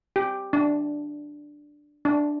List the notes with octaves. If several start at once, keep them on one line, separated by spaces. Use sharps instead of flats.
G4
D4
D4